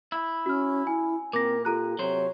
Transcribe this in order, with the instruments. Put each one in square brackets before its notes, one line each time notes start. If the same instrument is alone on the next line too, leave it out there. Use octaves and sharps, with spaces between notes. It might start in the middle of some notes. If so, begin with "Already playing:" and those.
[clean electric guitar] E4
[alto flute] C#4 [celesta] F#4 F6
[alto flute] E4 [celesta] G#5
[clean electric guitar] A#2 [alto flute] C4 [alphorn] A#4 [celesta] D6 A#6
[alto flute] F4 [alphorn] G4 [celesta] A4 A#5 F#6
[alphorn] C3 [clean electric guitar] F#3 C5 [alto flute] C#5